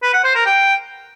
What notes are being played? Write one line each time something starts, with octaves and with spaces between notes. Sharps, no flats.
B4
F#5
C5
A#4
G5